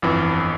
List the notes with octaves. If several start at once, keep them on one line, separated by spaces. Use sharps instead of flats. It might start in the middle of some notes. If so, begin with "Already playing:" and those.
G1 F2 E3